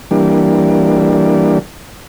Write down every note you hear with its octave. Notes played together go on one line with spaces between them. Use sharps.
E3 G3 A#3 D4